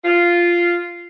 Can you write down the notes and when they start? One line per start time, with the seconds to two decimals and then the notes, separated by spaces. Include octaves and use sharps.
0.05 F4